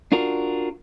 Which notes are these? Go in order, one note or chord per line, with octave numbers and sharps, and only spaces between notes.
D4 F4 F#4 A#4